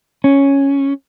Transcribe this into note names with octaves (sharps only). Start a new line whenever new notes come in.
C#4